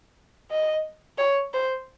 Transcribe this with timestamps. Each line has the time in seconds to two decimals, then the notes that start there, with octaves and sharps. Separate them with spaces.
0.51 D#5
1.19 C#5
1.54 C5